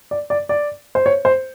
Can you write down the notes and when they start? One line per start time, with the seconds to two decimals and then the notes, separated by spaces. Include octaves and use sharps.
0.11 D5
0.30 D5
0.49 D5
0.95 C5
1.06 C#5
1.25 C5